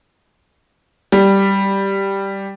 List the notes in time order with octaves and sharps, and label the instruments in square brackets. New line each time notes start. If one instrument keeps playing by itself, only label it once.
[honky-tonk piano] G3